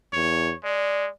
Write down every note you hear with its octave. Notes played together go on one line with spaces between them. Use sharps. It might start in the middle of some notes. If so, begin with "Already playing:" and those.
E2 C#5
G#3 D5